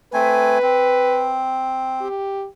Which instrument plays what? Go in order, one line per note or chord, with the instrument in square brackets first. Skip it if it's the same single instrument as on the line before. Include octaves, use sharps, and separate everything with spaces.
[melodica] A3 C4 G#5 [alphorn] B4
[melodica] C4
[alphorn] G4